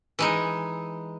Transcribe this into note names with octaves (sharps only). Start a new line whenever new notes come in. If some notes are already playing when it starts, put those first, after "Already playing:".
E3 G#3 D#4